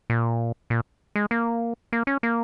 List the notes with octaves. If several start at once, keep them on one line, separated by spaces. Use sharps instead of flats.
A#2
A#2
G#3
A#3
A#3
C#4
A#3